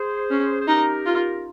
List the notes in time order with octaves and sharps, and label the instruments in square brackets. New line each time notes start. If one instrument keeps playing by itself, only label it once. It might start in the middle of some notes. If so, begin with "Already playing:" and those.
Already playing: [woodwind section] G#4 C5
[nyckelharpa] C#4
[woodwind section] C5
[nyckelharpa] D#4 [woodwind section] G4 A#4
[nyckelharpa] F4